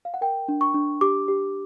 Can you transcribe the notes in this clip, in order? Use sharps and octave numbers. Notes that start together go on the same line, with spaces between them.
F5
F#5
A#4 G5
D4
C#6
D4
G4 D6
G4